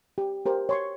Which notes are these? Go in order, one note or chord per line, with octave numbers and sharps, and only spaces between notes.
G4
G4 A#4 C5
C#5 C6 C#6